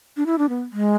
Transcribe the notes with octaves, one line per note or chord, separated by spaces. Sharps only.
D4
E4
D4
B3
G#3